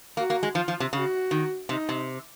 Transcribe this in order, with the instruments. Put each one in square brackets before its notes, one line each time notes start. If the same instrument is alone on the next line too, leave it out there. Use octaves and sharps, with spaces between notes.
[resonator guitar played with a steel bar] A#3 [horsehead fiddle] F#4
[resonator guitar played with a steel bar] A#3
G#3
[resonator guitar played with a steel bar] F3 [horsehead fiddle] F4
[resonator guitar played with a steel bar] F3
C3
[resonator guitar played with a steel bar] C#3 [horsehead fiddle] F#4
[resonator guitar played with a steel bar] D#3
[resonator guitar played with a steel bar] C3 [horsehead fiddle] D#4
[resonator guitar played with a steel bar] C3